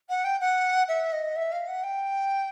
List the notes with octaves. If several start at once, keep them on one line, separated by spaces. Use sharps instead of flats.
F#5
G5
F#5
E5
D#5
E5
F5
F#5
G5